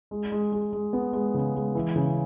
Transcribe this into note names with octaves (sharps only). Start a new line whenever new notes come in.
G#3
G#3
G#3
G#3
B3
G#3
C#3
G#3
E3
C#3